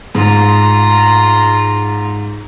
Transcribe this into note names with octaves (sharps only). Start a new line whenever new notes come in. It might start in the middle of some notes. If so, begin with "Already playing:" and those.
G#2 F4 A#5